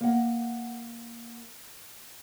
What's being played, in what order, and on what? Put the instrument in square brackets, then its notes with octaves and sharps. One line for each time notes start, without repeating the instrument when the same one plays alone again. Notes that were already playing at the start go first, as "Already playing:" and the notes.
[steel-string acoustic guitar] A#3 F#5